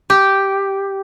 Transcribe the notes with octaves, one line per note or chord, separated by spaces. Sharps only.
G4